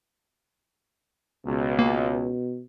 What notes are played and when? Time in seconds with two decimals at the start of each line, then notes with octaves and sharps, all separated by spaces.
1.46 C#2 B2
1.79 A#3